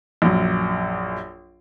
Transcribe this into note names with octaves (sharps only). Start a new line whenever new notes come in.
A#1 F#2